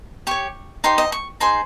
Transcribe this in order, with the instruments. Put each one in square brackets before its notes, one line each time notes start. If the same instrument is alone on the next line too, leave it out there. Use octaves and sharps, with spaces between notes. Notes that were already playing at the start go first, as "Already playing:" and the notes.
[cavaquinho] G4 C#5 C#6
D#4 G4 C5 C6
D#5
C#6
D#4 G#4 C5 C6